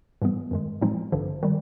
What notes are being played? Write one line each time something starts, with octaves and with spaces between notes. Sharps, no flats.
G#2 E3 G3 B3
F#2 D#3 G#3
A2 F3 G#3 C4 D#4
A1 G2 D3 F3
D#3 G3